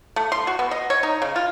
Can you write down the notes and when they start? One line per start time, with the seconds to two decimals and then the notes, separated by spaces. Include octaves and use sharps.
0.16 A3
0.32 C6
0.47 F#4
0.59 B3
0.71 D#5
0.90 C#5
1.03 D#4
1.22 C#3
1.36 F4